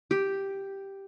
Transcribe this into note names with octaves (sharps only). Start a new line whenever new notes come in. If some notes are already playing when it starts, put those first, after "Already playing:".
G4